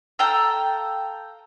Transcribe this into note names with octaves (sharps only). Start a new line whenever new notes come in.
A4 F5 G5 A#5